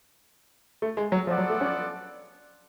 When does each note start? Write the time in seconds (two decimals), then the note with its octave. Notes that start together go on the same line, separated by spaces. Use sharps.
0.82 A3
0.97 G#3
1.12 F#3
1.27 F3 B3 F4 A4 D5 F#5
1.38 F#3
1.50 A3
1.61 C#4